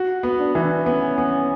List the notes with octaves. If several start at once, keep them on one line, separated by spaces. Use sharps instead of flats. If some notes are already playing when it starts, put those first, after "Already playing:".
Already playing: F#4
B3
D4
E3
B3 C#4
B3